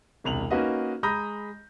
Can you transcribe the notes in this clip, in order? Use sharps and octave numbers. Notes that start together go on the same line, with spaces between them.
E1 C2 F7 F#7
A#3 C#4 D#4 F#4 B4 D#5
G#3 A#5 B5 D#6 G6 A#6